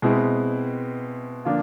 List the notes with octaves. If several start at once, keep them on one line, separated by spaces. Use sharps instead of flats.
B2 G#3 C4 E4
D3 F3 A#3 D4 F4